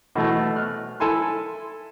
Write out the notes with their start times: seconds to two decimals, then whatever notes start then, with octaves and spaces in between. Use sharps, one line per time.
0.16 B2 E3 A3
0.56 F6 F#6
1.00 E4 A4 G#5 C6